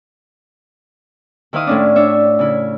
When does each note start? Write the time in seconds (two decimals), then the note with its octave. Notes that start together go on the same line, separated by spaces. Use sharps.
1.53 D#3 E4 C5 F5 D#6
1.67 A2 C#4 D4
1.96 D4 C#5 E5
2.39 C#3 E4